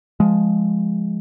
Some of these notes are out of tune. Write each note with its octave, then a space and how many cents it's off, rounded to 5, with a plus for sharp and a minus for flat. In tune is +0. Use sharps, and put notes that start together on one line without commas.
F3 +0 G#3 +0